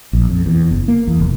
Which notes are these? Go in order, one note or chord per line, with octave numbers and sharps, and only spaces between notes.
A#1
F2
E2
F#1
A#3
E2
F1